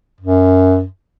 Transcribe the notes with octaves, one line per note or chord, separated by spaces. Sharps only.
F#2